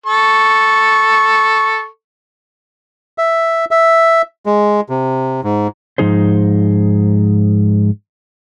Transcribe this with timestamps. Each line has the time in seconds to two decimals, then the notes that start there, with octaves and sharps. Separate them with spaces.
0.06 A4 C#6
3.18 E5
3.71 E5
4.46 G#3
4.89 C3
5.44 G#2
5.98 G#2 E3 F3 D#4 G#4 C5